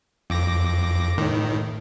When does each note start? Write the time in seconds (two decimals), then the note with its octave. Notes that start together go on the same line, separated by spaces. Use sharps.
0.30 F2 D6 A#6
1.17 A2 D#3